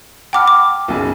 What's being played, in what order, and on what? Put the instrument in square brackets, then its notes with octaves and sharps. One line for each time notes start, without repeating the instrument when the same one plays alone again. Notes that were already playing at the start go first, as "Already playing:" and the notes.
[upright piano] F#5 A5 B5 [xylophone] G5 D6 F6
[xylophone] D6
[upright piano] B1 F#2 C#3